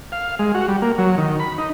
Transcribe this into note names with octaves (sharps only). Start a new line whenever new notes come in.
F5
G#3
F#4
G3
A#3
F#3
D#3
B5
D#4